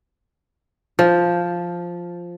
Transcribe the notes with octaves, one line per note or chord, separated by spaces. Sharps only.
F3